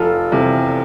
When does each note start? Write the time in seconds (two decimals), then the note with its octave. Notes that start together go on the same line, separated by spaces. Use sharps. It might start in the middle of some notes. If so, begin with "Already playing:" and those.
Already playing: F1 F4 A4
0.32 E2 C3